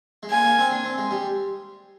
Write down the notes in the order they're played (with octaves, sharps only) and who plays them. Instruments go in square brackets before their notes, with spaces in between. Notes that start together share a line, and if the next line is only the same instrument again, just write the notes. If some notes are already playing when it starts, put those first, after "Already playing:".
[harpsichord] G#3
[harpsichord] A#3 [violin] G#5
[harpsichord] A#3
C4
D4
C4
G#3
G3